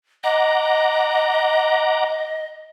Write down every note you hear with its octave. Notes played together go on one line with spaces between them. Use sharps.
D#5 F#5 A#5 D6